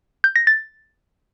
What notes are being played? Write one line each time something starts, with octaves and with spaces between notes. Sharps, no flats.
G6
A#6
A6